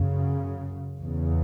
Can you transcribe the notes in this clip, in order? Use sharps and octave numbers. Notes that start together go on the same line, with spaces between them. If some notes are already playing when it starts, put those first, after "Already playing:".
Already playing: F#2 C#3
E2 C#3